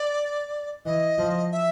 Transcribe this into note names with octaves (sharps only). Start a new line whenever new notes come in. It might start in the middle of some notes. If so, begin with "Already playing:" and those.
Already playing: D5
E3 D#5
F3
E5